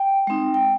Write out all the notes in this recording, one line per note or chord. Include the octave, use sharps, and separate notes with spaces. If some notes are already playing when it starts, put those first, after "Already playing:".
Already playing: G5
G#3 C4 D#4
G5